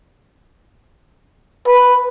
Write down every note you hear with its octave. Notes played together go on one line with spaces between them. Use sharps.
B4